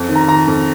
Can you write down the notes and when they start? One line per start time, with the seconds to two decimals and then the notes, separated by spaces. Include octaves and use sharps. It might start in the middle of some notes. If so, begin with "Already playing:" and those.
Already playing: F2
0.09 D#3
0.16 A#5
0.28 D#3 A#5
0.48 F2